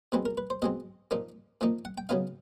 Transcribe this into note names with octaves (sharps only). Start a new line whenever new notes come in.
B2 G#3 C4 B4
A#4
B4
C5
B2 G#3 C4 D#5
A#2 F3 A#3 D#4
A#2 F3 A#3 D#4
F#5
G5
C#3 F#3 B3 D#4 F5